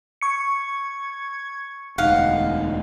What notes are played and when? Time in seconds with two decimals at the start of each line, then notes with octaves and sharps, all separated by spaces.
0.21 C#6 G#6 C#7
1.98 E1 D2 D#4 F5 F#5